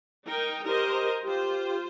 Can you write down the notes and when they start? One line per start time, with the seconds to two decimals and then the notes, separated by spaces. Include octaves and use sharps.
0.25 D#4 A#4 G5
0.64 G4 A#4 C5 D#5
1.23 F4 G4 C5